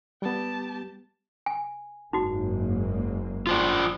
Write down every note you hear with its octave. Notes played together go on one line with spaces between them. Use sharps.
G3 B3 G4 A5
G#5
F#1 G#2 A#3 D#4 F#4
F4 C5 D5